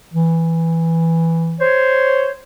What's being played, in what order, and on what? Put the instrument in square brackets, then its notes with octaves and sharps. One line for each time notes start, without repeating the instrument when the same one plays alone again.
[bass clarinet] E3
[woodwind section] C5 C#5